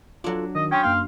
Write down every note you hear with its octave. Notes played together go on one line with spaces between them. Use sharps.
F#3 D4 F4 A4
D#3 D#5
C#4 G5 C6 D#6
F#2 A#3 F5 C6